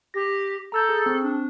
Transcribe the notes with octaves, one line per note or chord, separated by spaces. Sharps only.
G4 A#6
A4 A#5 E6 G6
G#4
C4
D4